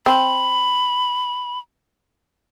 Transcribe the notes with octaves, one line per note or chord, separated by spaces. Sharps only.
C4 B5